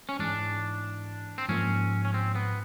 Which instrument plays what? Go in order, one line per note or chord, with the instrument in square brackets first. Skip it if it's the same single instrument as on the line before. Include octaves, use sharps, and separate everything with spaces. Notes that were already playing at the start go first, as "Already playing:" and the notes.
[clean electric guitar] C#4
[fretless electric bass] G#2 E3 G#3 [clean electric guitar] D4
[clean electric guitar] C4
[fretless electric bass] G#2 F3 A#3 [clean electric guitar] C#4
[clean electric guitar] C#4
C4
B3